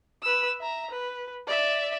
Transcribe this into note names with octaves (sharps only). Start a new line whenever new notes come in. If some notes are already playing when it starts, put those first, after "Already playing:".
B4 E6
E5 A#5
B4
D5 E5